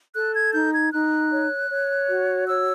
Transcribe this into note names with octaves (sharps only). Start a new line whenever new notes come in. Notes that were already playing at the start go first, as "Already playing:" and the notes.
A4 F#6
G#6
D#4 G6
G#6
D#4 F#6
C#5
C#5
F#4
C#5 E6